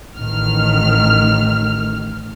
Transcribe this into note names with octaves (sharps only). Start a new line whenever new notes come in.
A1 D#3 F6